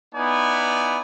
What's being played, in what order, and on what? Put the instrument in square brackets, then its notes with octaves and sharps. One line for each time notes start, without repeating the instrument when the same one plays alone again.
[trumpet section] B3 D#4 E4 D5 G#5